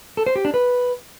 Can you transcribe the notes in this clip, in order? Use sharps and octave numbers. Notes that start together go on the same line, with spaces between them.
A4
C5
G4
D4
B4